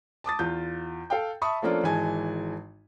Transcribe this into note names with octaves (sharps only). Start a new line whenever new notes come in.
A5 D6 D#6 A6
E2 F4 G6
A4 F5 G5
E5 A5 B5 C#6 D#6
F3 A3 A#3 C#4 D4 F4
G#1 E3 G#3 G#5 A5